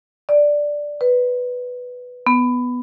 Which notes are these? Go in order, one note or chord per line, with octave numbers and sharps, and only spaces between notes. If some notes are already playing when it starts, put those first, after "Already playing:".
D5
B4
B3